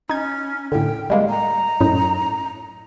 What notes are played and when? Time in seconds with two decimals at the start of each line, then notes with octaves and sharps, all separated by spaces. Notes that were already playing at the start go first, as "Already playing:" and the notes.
0.09 C#4 D#4 G#6
0.72 A2 D3 G5
1.10 G3 G#3 A#3
1.29 A#5
1.80 F#2 A2 D#4